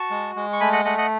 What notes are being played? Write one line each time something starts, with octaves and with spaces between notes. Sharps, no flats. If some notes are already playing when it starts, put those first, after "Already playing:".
Already playing: F#4 A5 C#6
G#3
G#3
C#6
A3 G#5 B5
D#5 F#5
A3 D#5 F#5
D#5 F#5